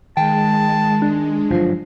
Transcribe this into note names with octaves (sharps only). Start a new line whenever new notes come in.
D#3 G#3 G5 A5
D4
G1 G#2 F3 F#3